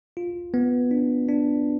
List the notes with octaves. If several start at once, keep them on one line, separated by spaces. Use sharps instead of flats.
F4
B3
D4
D4